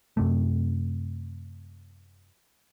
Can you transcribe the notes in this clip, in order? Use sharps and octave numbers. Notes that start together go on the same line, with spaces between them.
F#2 C3 A3